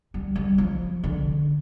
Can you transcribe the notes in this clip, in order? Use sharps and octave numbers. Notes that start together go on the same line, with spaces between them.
G3
G3
F3
D3